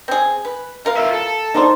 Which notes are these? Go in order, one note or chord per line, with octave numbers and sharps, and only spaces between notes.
C4 G#4
B4
B2 A#4 F5
F4 E5
A4
F#3 A#3 D4 D#4 C5